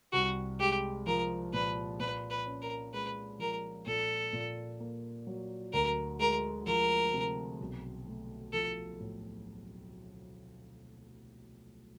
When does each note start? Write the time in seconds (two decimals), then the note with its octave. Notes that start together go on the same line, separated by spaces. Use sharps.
0.13 C2 F#4
0.60 G#3 G4
1.07 F3 A#4
1.53 A#2 B4
2.00 A#2 B4
2.30 B4
2.46 C#4
2.62 A#4
2.93 G#3 B4
3.39 F3 A#4
3.86 A#2 A4
4.33 A#2
4.80 A#3
5.27 F#3
5.73 D2 A#4
6.20 G#3 A#4
6.67 F3 A#4
7.13 C3
7.60 B1
8.07 A3
8.53 F3 A4
9.00 A2